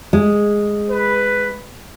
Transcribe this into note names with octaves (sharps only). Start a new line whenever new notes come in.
G#3
B4